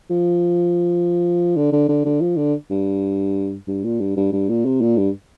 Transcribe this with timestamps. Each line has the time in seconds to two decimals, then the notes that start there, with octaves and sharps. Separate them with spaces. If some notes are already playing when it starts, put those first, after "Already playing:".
0.10 F3
1.56 D3
1.72 D3
1.89 D3
2.05 D3
2.21 F3
2.37 D3
2.70 G2
3.68 G2
3.84 A#2
4.00 G2
4.17 G2
4.33 G2
4.49 A#2
4.65 C3
4.81 A#2
4.97 G2